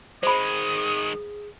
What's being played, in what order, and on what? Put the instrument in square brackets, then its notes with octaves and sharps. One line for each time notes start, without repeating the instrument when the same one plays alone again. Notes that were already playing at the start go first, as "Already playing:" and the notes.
[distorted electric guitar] D#3 G#3 [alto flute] G#4 [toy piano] C5 B5 [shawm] D#6